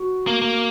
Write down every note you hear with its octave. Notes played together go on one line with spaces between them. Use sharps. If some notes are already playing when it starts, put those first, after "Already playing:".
Already playing: F#4
A#3
A#3